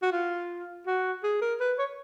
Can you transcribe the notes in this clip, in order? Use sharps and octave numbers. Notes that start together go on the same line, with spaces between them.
F#4
F4
F#4
G#4
A#4
B4
C#5